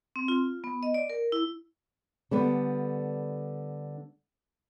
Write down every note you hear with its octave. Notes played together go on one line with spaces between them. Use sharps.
C4
F4
B3
D#5
D5
A#4
E4
D3 G3 B3